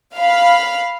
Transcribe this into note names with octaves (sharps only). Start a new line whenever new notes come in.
F5 B5